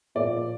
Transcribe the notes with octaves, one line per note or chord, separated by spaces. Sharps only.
A#2 F3 A#3 D5